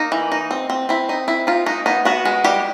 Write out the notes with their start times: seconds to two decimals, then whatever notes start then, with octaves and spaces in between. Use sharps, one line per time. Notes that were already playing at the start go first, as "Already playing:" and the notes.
Already playing: A#3 D#4
0.12 E3
0.32 D#4
0.51 C4
0.70 C4
0.89 C4 E4
1.09 D#4
1.28 C4 E4
1.47 D#4 F4
1.66 G#3 D#4
1.86 B3 D#4
2.05 B3 F#4
2.25 G#3
2.44 G3 G4